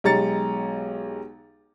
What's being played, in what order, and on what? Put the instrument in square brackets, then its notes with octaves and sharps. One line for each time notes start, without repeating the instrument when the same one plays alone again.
[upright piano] B1 G#3 G4 A#5 A6 C#7